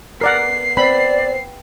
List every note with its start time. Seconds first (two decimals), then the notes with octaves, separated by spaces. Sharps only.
0.21 B3 A#4 D5 F#5 C7
0.77 C4 D5 B5